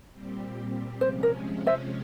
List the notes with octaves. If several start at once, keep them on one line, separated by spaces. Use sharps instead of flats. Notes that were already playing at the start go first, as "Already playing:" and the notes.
A#2 G3 C4 G4
C3 F3 G#3 C#4 C5
A#4
C5 E5